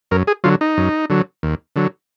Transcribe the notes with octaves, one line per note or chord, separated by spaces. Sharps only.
F#2 A#4
G#4
D3 F#3 F4
D#4
F#2
D3 F#3
D#2
D3 F#3